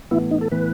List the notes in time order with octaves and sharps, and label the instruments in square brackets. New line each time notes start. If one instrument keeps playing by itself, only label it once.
[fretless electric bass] A2 E3 B3 [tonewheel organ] E4
[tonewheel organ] D#4
A4
[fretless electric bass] A2 E3 B3 [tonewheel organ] B4